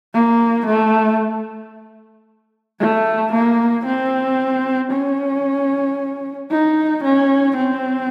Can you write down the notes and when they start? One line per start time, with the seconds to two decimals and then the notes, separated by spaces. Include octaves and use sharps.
0.14 A#3
0.67 A3
2.80 A3
3.33 A#3
3.85 C4
4.92 C#4
6.51 D#4
7.04 C#4
7.57 C4